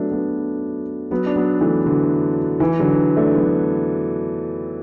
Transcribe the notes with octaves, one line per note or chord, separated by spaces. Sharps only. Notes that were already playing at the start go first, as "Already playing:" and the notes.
Already playing: F#3 A3 B3 D4
F#3 B3
F#3 B3
D4
F#3 B3
E3 A3
D3 F#3
E3
D3 F#3
A3 D4
F#3 B3